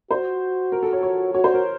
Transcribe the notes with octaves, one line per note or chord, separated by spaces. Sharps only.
F#4 C5
A#4
A4
C#5
C#5
F#4 C#5
C5
A#4